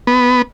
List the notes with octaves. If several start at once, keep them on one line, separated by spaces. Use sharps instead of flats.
B3